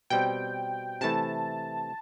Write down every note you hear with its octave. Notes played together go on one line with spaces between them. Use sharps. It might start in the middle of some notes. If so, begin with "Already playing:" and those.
B2 G3 C4 G5
C3 E3 A3 E4 A5